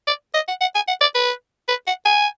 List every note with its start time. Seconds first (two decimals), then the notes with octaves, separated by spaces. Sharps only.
0.07 D5
0.34 D#5
0.48 F#5
0.61 F#5
0.75 G#5
0.88 F#5
1.01 D5
1.15 B4
1.68 B4
1.87 F#5
2.05 G#5